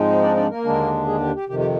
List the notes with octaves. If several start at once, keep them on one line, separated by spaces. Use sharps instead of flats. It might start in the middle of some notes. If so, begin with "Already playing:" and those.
Already playing: G#2 F3 G#3 C4 D#4
D4 D5
D4 D5
A#3 A#4
D#2 D3 G#3 D4
G#3 G#4
G4
G4
F2 C3 D#3 G4
G4